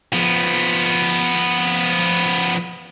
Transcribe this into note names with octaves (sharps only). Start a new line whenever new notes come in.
F3 B3